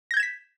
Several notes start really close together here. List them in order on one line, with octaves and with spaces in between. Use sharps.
A#6 G6 G#6 E7 B6